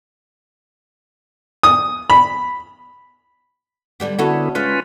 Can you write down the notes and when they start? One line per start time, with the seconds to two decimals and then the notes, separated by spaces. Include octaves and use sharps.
1.63 D#6
2.10 B5
4.00 D3 G3 B3
4.19 D3 B3 C#4 E4 F#4 A4
4.55 C#3 G#3 C#4 F4 B4